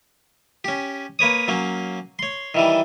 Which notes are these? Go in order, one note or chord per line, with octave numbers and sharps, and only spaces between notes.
C#4 G4
A#3 B4 C#5 D#6
F#3 A#3 C#4
C#5 C6
D#3 E3 G3